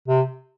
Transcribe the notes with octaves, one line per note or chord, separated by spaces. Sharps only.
C3